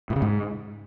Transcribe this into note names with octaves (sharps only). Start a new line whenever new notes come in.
A2
C#3
G#2